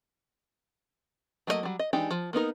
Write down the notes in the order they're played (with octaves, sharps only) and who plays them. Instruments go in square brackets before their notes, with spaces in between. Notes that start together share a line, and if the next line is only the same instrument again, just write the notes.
[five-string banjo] F#3 A3 A#3 F#4 D#5
F#3 G3
D#5
E3 G#3 D4 D#4 G4
F3
A#3 B3 D#4 A#4